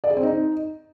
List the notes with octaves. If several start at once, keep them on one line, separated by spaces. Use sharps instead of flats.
D5
G#4
C4
D#4